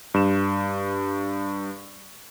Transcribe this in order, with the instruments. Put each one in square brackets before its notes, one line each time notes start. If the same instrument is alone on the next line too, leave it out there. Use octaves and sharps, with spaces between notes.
[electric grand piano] G2 E7